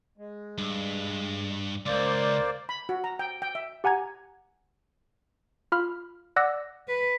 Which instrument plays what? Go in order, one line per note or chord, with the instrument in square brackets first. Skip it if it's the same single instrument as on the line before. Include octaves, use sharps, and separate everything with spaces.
[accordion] G#3
[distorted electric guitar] G2
[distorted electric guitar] C#2 [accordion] A#3 C5 D5
[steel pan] B5
F#4
A#5
G5
G5
E5
[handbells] G4 F#5 G#5 A#5 G#6
F4 F5 B5 F6
D5 F#5 D6 E6 F#6 A#6
[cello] B4